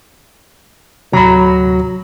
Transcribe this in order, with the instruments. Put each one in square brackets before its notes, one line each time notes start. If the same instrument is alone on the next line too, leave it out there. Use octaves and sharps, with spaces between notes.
[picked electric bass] D2 A2 C3 [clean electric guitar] F#3 [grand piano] A#5 B5